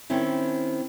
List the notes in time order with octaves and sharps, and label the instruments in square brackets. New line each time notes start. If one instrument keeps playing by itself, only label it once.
[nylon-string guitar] D#3 C4 C#4 E4